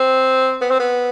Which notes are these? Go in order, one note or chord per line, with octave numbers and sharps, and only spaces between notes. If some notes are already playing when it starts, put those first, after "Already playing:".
Already playing: C4
B3
C4
B3